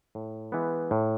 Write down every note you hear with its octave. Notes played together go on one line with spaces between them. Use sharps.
A2
E3 G#3 B3
A2